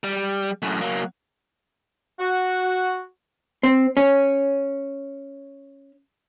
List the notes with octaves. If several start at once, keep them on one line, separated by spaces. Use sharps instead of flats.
G3
F#2 A2
F#3 A#3
F#4
C4
C#4